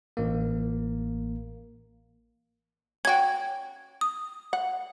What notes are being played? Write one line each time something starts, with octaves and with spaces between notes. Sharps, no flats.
A1 A#3
C#4 F#4 G5 G#6
D#6
F#5